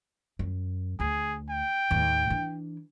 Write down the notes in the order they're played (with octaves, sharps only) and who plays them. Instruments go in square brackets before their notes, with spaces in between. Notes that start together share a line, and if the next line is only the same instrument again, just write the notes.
[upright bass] F#2
[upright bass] D2 [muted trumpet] G#4
[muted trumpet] G5
[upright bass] D#2 A2
E3 D4